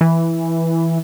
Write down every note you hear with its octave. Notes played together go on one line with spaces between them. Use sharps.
E3